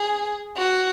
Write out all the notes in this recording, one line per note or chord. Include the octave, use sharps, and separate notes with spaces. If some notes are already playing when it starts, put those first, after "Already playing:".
Already playing: G#4
F#4